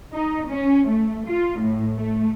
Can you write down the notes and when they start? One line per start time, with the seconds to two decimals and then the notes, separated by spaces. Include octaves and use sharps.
0.14 D#4
0.48 C#4
0.87 A3
1.28 F4
1.60 A2
1.98 A3